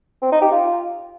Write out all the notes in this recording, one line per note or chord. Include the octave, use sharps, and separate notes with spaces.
C4
D#4
G4
F4